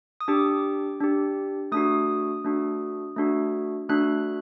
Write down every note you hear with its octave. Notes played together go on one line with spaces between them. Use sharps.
D#6
D4 G4 D6
D4 G4
A3 D4 F#4 D#6
A3 D4 F#4
A3 D4 F#4
A3 D4 F#4 F#6